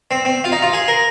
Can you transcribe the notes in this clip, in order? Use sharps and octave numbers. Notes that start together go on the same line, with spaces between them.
C4
C4
F4
D#4
F4
G#4
A#4